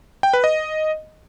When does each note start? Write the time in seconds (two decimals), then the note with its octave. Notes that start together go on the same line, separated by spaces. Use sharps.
0.23 G5
0.33 B4
0.44 D#5